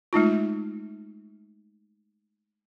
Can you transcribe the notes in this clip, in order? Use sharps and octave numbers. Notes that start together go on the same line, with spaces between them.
G#3 A3 D#4 F4